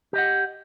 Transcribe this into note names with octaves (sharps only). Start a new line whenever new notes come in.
G4 D#5 F#5